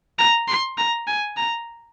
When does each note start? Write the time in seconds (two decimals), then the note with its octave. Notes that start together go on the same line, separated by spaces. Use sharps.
0.19 A#5
0.48 C6
0.78 A#5
1.07 G#5
1.37 A#5